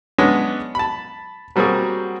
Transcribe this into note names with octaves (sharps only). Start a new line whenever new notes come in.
G#3 B3 C#4 D4
A5 B5
F#3 G3 A#3 C4 F#4 G#4